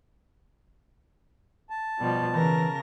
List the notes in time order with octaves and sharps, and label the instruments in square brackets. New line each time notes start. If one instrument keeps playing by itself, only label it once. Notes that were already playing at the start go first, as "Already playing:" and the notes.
[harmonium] A5
[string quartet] B2 F3 G3
[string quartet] C#3 A#4 A#6 [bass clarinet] E3